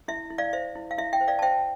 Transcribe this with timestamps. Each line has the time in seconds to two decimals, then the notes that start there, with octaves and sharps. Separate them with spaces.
0.08 E4 E5
0.30 E4
0.38 D5 F5
0.53 C5 E5
0.75 E4
0.91 F5
0.98 E4 E5
1.13 E5 G5
1.21 C5
1.28 D5 F5
1.39 A5
1.42 C5 E5 G5